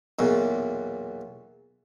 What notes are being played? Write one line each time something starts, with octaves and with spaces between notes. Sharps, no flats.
B1 E2 A#2